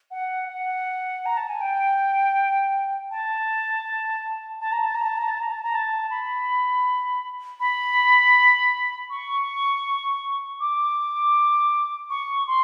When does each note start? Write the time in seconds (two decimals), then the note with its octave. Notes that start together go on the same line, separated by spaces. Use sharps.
0.11 F#5
0.49 F#5
1.26 A#5
1.37 A5
1.49 G#5
1.61 G5
3.11 A5
4.61 A5
4.72 A#5
4.83 A5
4.95 A#5
5.06 A5
5.17 A#5
5.28 A5
5.40 A#5
5.51 A5
5.63 A#5
5.75 A5
6.10 B5
7.60 B5
9.10 C#6
10.60 D6
12.10 C#6
12.47 C6